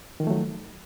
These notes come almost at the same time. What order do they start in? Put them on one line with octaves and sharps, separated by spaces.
D#3 F3 A3 F#3